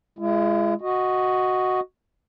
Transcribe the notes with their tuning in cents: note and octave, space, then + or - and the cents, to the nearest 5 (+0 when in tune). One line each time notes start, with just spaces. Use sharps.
G#3 +0 E4 +45
F#4 +0 D#5 +0